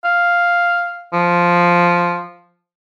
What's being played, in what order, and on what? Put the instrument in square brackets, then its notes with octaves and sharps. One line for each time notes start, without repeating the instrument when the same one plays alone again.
[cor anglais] F5
F3